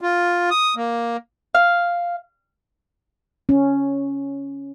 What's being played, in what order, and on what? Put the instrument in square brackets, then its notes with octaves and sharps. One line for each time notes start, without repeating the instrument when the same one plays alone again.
[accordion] F4
D#6
A#3
[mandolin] F5
[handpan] C#4